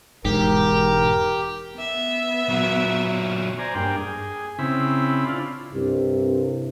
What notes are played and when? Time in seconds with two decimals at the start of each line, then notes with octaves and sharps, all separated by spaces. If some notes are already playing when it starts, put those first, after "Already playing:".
0.25 E1 G#2 G4 A#4
1.75 B3 E5
2.49 A#2 F#3
3.59 C5 D5 G#5 A#5
3.75 G2 A#3 D4 G5
3.97 G#4
4.59 C#3 C4 E4 B5
5.27 D4 F4
5.73 C2 G2 C3